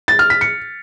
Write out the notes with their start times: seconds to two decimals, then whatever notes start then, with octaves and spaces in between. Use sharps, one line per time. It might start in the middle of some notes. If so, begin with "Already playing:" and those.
0.08 A6
0.19 F6
0.30 B6
0.41 C#7